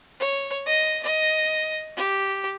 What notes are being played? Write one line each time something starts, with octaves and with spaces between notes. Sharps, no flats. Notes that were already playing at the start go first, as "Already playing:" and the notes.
C#5
D#5
D#5
G4